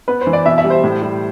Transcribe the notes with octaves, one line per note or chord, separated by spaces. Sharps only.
B3 B4
C5
E3
D5
B2 E5
E5
G3
C5
A2
G3